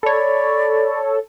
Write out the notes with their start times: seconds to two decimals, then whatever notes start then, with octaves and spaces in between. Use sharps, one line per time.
0.03 A4 C#5 D5 B5